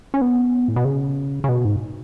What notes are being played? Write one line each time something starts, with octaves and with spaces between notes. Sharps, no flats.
C#4
B3
A2
B2
C#3
C#3
B2
G#2